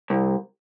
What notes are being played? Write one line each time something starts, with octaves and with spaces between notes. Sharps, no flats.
C2